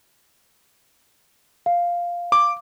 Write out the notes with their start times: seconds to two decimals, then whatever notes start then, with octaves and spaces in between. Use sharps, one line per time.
1.66 F5
2.32 D6